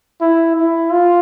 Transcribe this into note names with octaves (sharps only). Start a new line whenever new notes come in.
E4
E4
F4